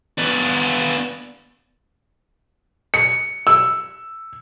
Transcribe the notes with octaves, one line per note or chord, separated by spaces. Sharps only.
B3 D4
C#7
E6